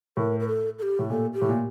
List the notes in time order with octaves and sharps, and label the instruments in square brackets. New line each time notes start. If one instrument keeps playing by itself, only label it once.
[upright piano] A2 [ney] A#4
[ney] A#4
A4
A4
G4
[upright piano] A2
[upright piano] A#2 [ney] A4
[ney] G4
[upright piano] A2
A#2